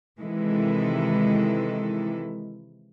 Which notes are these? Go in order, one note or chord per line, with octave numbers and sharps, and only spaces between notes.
C3 D#3 E3 G#3 E4 A4